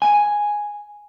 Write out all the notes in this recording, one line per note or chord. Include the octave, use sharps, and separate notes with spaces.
G#5